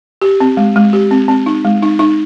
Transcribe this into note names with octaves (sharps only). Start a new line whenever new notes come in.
G4
C4
G#3
G#3
G4
C4
C4
D#4
G#3
D#4
D#4